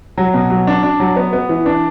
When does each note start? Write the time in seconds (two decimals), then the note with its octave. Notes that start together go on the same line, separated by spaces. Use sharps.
0.18 F#3
0.34 B2
0.50 F#3
0.67 D4
0.83 D4
1.00 F#3
1.16 B3
1.33 B3
1.49 E3
1.66 D4